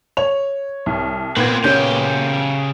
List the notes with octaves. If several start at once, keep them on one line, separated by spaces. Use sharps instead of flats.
C#5 F7
C2
A#2 B3 C4 B4 G#6
C#3 C#4 G4 G6